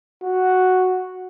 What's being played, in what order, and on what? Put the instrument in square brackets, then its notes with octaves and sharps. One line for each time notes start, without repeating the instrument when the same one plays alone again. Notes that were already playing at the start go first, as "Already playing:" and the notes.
[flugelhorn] F#4